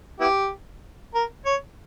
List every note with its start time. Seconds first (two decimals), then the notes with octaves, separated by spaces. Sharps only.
0.20 B3 E4 G4
1.15 A#4
1.45 C#5